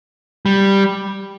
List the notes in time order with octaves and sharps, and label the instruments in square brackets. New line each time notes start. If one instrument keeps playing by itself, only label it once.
[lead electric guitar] G3